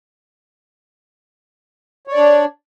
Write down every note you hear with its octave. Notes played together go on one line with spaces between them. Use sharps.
D4 C#5 D5